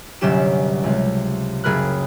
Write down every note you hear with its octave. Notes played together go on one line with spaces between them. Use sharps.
G1 C3 F#3 C#4 G4 E7
C#2 C3
F#1 G#4 A#4 B5 F#6